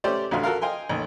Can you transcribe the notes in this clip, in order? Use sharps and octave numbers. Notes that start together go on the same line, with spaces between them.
A3 C#4 G4 C5 D5
A1 D2 F#4 F5 C6
F#4 A4 A#4 F5
D#5 F5 G5 G#5 C6
A1 D#2